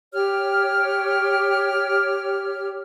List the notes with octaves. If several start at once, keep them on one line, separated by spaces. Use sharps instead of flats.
G4 C#5 F6